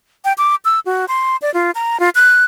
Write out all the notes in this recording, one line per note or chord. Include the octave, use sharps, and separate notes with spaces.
G5
D6
E6
F#4
C6
D5
F4
A#5
F4
F#6